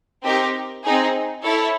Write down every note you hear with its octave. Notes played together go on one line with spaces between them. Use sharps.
C4 D#4 G4 A#4
C4 D#4 G#4
E4 A4 C#5